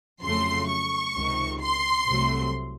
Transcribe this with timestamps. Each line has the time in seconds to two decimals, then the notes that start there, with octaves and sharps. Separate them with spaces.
0.23 F2 C#3 F#3 A3 C6
0.68 C#6
1.15 C#2 C3 D#3
1.61 C6
2.08 C2 C3 F#3 A3